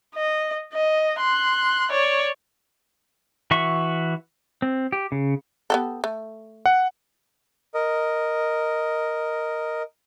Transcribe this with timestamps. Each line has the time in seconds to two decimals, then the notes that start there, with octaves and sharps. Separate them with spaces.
0.15 D#5
0.73 D#5
1.19 C6 F#6
1.91 C#5 D5
3.51 E3 F#4 E5 C#6
4.62 C4
4.92 G4
5.12 C#3
5.70 B3 G4 A4
6.04 A3
6.66 F#5
7.74 A#4 D#5